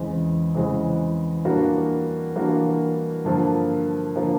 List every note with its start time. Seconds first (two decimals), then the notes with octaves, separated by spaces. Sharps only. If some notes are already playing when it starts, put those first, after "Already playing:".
Already playing: E2 C#3 E3 G#3 C4
0.54 E2 C#3 E3 G#3 C4
1.45 E3 G3 A#3 D4 F#4
2.35 E3 G3 A#3 D4 F#4
3.25 G2 D3 F3 A#3
4.16 D3 F3 A#3